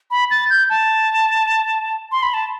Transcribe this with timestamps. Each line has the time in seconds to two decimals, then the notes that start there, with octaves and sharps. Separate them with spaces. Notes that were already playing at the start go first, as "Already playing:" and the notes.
0.11 B5
0.31 A6
0.50 G6
0.70 A5
2.12 C6
2.23 B5
2.34 A5